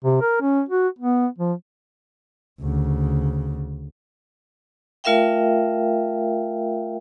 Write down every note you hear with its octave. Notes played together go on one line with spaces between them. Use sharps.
C3
A#4
C#4
F#4
B3
F3
D2 C#3
A3 F4 A#4 E5 F5 G5